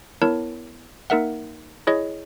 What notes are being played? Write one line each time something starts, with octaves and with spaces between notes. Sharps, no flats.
B3 E4 A#4 C#5 A5
A#3 D#4 A#4 E5 F#5
E4 G#4 C#5 D#5